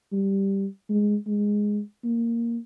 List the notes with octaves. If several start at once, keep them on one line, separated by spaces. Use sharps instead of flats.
G3
G#3
G#3
A#3